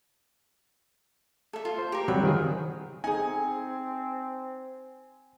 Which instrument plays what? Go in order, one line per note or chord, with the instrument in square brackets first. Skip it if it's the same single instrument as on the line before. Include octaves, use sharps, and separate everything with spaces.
[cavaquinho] A4 E5
F4
[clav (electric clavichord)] C5
[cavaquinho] G4 A#4
[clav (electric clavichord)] F#3 G3 C4 [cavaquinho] B5
[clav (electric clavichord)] D#3 F3 G#4
[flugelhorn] C4 [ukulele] D#4 G#4 [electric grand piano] G#5